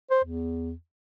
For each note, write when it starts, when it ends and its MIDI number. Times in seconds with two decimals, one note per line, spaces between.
0.11 0.21 72
0.25 0.73 40